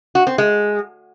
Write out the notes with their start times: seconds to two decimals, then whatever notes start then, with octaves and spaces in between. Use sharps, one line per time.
0.15 F#4
0.27 C4
0.38 G#3